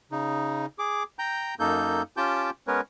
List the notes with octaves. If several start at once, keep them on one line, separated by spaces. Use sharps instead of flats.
C#3 D#4
G#4 D6
G5 A#5 G6
F#2 A#3 D#4 A4 G6
C#4 F4 G4 G5 A5 G6
G#3 B3 C#4 A#4 B4 C#5